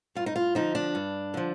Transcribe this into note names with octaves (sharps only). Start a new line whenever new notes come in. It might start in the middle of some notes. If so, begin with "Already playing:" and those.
G2 F4
D#4
F4
D3 F3 D#4
D4
G2
D3 F3